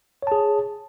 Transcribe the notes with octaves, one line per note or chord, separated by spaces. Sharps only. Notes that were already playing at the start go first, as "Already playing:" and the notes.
G#4 C#5 A5